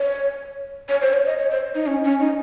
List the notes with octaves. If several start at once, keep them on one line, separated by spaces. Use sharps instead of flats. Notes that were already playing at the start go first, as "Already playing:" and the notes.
Already playing: C#5
C#5
C5
C#5
D#5
C#5
C5
D#4
C#4
C#4
D#4